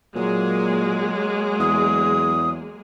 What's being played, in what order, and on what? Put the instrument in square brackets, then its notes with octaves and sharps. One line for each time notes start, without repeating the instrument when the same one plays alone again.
[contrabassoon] A#2 [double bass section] F#3 [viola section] G#3 A#3 G#4
[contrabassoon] E2 [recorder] D#6